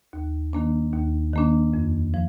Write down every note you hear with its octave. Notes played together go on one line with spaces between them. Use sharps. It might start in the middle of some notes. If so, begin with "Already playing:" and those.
D#2
D#3 A#3 D4
D#2
D#3 A#3 D4
F2
F3